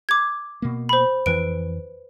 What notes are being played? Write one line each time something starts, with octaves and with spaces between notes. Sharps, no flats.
D6 G#6
B2 A#3
C5 B5
F2 E3 B4 D7